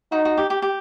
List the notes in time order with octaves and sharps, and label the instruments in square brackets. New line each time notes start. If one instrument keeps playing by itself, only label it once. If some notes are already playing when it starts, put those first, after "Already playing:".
[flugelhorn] D#4 [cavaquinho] F#4
[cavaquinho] F#4
G4
G4
G4